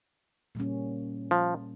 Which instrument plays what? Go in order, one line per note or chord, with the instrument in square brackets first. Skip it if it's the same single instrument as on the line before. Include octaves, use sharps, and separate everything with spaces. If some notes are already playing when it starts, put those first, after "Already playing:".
[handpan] A#2 G3 A#3 C#4
[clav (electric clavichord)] F3